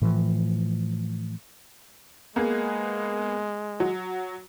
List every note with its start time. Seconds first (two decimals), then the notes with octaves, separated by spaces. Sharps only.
0.02 A2 E3 F3
2.36 G#3 A#3 B3 G#4
3.80 F#3